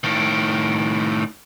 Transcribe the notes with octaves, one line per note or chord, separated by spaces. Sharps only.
A2 D#3